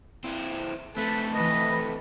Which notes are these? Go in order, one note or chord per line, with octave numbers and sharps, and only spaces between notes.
E3 C4
A3 C4 A4 B4
E3 B4 D#5